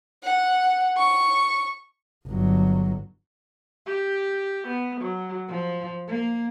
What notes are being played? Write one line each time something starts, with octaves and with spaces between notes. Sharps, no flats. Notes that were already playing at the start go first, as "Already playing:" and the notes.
F#5
C#6
G1 F#3
G4
B3
F#3
F3
A#3